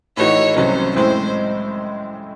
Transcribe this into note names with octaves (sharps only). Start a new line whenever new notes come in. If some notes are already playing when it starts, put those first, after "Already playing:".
A2 E3 A3 D#4 F#4 C#5
C2 C3 F#3 C#4 C5
A2 G#3 C4 E4 C5